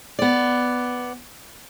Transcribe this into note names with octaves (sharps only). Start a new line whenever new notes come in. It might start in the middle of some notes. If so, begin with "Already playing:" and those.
B3 D5